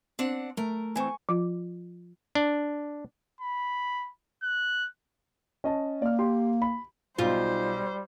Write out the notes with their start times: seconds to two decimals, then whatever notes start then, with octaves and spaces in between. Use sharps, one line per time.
0.19 C4 D4 F#5
0.57 A3 A#4
0.96 E3 C4 G#5 C#6
1.29 F3 F4
2.35 D4
3.40 B5
4.43 F#6
5.64 C#4 D#5 A5
6.02 A#3 D5 F6
6.19 G4 C6
6.62 B5
7.19 B1 G3 D#4 F4 C5